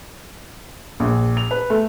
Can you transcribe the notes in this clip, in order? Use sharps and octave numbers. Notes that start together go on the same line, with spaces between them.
A#1
F7
B4
A3